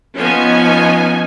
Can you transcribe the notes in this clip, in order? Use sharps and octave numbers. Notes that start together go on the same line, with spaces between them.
F3 B3 C#4 D#4 G#5